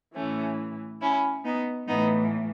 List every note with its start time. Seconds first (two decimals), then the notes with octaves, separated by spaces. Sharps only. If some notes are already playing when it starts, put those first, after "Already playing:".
0.15 A2 E3 A3 C#4
1.01 C#4 E4
1.45 B3 D#4
1.88 A2 E3 B3 D#4